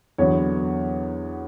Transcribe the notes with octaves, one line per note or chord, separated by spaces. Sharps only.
E2 D3 F#3 B3 C#5